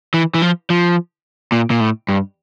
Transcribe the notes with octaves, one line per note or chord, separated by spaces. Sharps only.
E3
E3
F3
F3
A#2
A#2
A2
G2